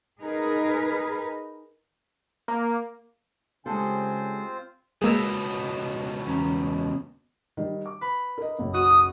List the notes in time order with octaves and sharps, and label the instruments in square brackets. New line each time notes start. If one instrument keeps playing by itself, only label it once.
[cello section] D#4 G#4 A#4 B4
[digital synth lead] A#3
[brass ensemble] C#3 G#5 [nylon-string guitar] G#3 G4 A4 [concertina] C4 F4 C5
[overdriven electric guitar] C#2 B2 [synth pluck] G#3 A#3 E6
[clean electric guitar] E2 C#4 A#5
[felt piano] D#3 G3
D6
[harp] B4 B5
[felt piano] A#4 D#5
F#1 B1
[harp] F#4 [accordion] D#6